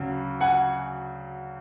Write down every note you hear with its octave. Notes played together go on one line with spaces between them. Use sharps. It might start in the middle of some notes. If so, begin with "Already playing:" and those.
Already playing: D2 C#3 F#3
F#5 G#5